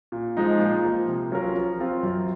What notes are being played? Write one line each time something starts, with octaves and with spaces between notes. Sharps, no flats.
A#2
F3 G#3 D#4
A#2
F3 A#3
C3
F#3 C#4 F4 A#4
F3
C4 F4
F#2